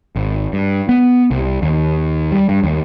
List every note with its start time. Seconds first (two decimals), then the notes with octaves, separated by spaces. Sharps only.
0.16 G#1
0.53 G2
0.89 B3
1.31 C2
1.62 D#2
2.32 G3
2.49 G2
2.64 D#2